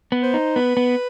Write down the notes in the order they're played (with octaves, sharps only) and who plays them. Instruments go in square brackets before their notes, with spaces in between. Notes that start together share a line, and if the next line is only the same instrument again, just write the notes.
[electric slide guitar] B3
[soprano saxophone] C5
[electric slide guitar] D#4
[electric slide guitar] B3 [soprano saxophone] B4
[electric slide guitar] B3